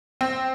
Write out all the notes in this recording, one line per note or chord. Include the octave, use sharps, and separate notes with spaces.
C4